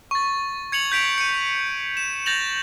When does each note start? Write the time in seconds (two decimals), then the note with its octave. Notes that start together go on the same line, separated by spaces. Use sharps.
0.11 C#6 A6
0.72 G#6 C#7 F7 F#7
0.92 G6 B6 D7 F7
1.18 C#7 D#7
1.97 E7
2.26 G6 A6 A#6 F7 F#7